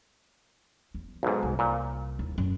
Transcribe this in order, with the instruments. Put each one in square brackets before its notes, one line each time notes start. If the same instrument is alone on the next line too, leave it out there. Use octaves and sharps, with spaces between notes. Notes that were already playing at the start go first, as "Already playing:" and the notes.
[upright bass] E2
[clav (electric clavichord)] B1 G#2
[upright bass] C2
[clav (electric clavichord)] A#2
[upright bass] D#2 E4
F#2